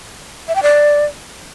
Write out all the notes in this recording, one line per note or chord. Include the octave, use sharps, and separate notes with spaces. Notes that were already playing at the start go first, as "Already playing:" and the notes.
E5
G5
D5